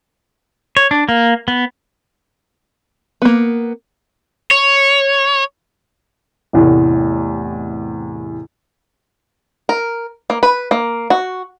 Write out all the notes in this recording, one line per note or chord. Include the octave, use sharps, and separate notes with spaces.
C#5
D4
A#3
B3
A#3 B3
C#5
A1 E2 A2 C3
A#4
A#3
B4
A#3
F#4